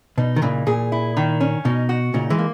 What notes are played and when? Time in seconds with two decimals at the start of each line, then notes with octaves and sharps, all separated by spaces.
0.18 B2 D#4
0.36 D#3
0.42 A#2 C#3 E3
0.67 A#2 G#4
0.92 E4
1.17 D#3
1.41 C#4
1.65 B2 D#4
1.89 F#4
2.14 A#2 C#3 D#4
2.30 E3 G#3
2.38 A#3